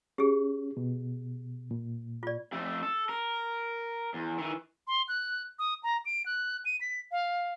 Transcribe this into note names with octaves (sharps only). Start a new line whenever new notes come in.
C#4 G4 G#4
B2
A#2
F4 D5
F2 A3
A4
A#4
E2
D#3 E3
C6
F#6
D#6
A#5
D7
F#6
D#7
B6
F5